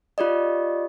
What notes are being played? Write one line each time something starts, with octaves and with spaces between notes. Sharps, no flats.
F4 G4 D5 D#5